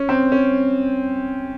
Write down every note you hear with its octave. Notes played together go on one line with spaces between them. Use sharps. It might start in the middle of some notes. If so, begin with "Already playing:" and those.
Already playing: C#4
C4
C#4